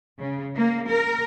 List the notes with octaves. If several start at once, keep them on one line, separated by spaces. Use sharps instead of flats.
C#3
A#3
A#4